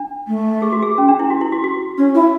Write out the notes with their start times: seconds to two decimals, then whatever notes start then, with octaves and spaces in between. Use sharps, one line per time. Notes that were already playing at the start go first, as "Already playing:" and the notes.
Already playing: D4
0.28 A3
0.62 G#4
0.72 F#4
0.83 G#4
0.98 C#4
1.08 D4
1.19 E4
1.30 F#4
1.41 E4
1.52 F#4
1.64 F#4
1.98 C#4
2.15 E4